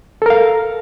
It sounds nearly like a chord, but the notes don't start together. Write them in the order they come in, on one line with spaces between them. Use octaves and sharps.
A4 A#4 F5